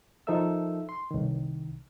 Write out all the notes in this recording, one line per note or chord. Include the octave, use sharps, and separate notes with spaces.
F3 D#4 A4 A#4 E5 E6
C6
C2 D#3